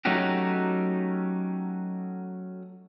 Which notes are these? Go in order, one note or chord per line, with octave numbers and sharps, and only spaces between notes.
F#3 A3 C#4 D#4 F#4 G4